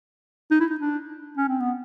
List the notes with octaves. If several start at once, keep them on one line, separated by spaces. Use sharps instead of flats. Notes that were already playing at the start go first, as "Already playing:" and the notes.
D#4
E4
D#4
D4
C#4
C4
B3